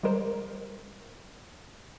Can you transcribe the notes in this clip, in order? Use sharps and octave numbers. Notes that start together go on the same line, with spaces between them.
G3 G#3 A#4 C5